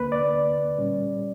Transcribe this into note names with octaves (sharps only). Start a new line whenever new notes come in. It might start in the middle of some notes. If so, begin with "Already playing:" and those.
Already playing: D2 D3 A#3 B4
D5
A#2 G3 C#4